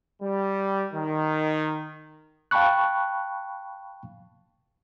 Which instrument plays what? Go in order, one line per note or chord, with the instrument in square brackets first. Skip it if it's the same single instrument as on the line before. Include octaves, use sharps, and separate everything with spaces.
[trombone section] G3
D#3
[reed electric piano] F5 G5 A5 B5 C#6 F#6